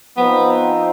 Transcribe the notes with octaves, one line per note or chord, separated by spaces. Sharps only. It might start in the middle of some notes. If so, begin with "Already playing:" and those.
F3 B3 C4 D#4